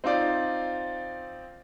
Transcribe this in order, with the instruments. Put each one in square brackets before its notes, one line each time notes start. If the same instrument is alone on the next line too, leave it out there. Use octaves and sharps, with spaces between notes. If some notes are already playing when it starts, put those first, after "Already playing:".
[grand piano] C4 D#4 F4 D5